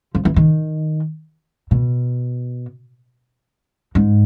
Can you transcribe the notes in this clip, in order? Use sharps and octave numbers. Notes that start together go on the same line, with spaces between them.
F3
E3
D#3
B2
G#2